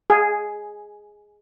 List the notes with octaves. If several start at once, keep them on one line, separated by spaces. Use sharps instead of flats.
G#4